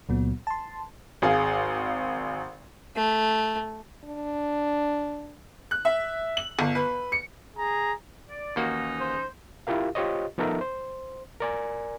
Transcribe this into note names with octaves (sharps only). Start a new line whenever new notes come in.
C#2 A#2 F#3 B3
A5 C6
G#1 G#4 F5
A3
D4
F#6
E5
F#7
G1
B4
C#7
G#4 A#5
D5
D#2 E3 A#3 C#4 D#4 F#4
C5
E4 F4 G4 A#4 F5
F4 G4 C5 C#5 D#5
F3 B3 D#4 A4 A#4 E5
C5
A#4 D5 G#5